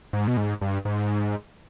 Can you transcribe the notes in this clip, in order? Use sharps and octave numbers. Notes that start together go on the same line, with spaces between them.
G#2
B2
G#2
G2
G#2